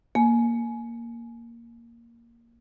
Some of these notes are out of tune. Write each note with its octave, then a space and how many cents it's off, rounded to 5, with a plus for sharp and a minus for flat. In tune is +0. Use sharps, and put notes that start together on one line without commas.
A#3 +0 G#5 +25